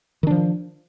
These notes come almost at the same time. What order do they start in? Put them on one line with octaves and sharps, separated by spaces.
D#3 D4 F3